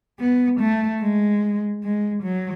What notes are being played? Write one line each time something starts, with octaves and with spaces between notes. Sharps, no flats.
B3
A3
G#3
G#3
F#3